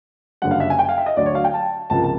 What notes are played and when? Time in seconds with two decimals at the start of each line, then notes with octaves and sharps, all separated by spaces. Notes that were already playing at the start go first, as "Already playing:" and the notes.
0.42 F#1 F#2 D3 G3 F#5
0.51 F5
0.60 E5
0.70 G#5
0.79 G5
0.89 F5
0.98 E5
1.06 D#5
1.17 D2 D3 F#3 D5
1.26 C#5
1.35 F5
1.44 G5
1.53 A5
1.90 C#2 C3 F3 A#3 A5
2.04 A5